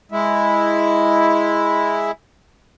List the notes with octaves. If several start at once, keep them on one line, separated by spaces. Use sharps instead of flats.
G#3 E4